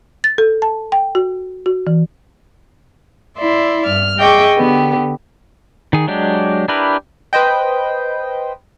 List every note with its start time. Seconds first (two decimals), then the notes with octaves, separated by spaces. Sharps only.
0.24 A6
0.38 A4
0.62 A5
0.92 G5
1.15 F#4
1.66 F#4
1.87 E3
3.38 E4 D5 E5 C6
3.86 G2 F6
4.18 G#4 D#5 E5 G5 C#6 D6
4.57 D3 B3 G4
5.93 D#3 G#4
6.08 F#3 G#3 D4 G4
6.68 D4 E4 G4 A#4 B4
7.33 B4 C5 D#5 G5